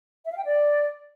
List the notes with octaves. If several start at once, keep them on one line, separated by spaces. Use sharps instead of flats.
E5
F5
G5
D5